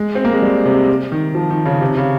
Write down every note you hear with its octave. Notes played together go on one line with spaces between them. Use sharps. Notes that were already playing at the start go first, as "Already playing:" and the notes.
Already playing: G#3
C4
A#3
G#3
G3
C3
D#3
F3
D#3
C#3
C3
C#3